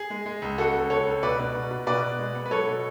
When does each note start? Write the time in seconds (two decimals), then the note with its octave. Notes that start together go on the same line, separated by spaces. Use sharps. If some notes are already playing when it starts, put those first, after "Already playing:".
Already playing: G#4
0.10 G#3
0.26 G#3
0.42 C#2
0.58 C#3 F#4 A4
0.74 C#2
0.90 C#2 A4 C#5
1.06 C#2
1.23 B2 B4 D5
1.39 B2
1.55 B2
1.71 B2
1.87 B2 B4 D5
2.02 B2
2.19 G#3
2.35 B3
2.46 B4
2.51 F#3 A4 C#5
2.67 B2